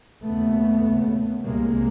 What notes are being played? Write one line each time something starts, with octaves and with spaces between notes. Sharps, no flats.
D#2 C#3 A3 B3
D#2 C#3
C2 C3 G#3 A#3